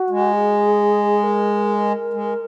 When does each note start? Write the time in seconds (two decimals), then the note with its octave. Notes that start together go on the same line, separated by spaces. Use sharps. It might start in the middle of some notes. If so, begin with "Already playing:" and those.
Already playing: F#4
0.10 G#3
0.33 G#4
1.23 A#4
2.13 G#3